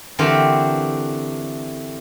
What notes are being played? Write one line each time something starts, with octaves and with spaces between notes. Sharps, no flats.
D3 E3 A3 C4 G4 A#4